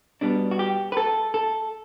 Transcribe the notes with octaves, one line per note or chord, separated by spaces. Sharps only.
B2 G3 B3 D4
F#4
G4
B4
A4
A4